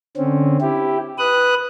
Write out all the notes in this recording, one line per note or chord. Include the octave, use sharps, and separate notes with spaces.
D3 C4 C#4
E4 G4
B4 D#6 F#6